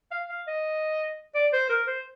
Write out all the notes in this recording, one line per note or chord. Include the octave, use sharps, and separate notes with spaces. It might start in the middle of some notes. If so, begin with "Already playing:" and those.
F5
F5
D#5
D5
C5
A#4
C5